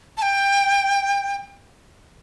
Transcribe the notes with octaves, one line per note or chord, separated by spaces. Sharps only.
A5
G5